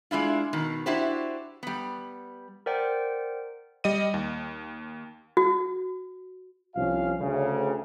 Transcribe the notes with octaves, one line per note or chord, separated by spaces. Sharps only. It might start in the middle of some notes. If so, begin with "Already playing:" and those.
G#3 D4 E4 F4
B2 D#3
D4 E4 F#4 G4 C5
G3 B3
A#4 C5 D5 F#5 G5
G3 D#5 D#7
D#2
F#4
C2 F3 C#4 F4 F5
D2 C#3